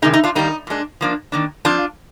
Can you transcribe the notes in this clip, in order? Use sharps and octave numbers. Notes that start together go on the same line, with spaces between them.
C3 D#3 G#3 D#4
D#4
D4 F4
D#3 G3 A#3 D#4
A#2 G#3 D4
F3 A#3 D4
D#3 A#3 D4
F3 C4 D4 F4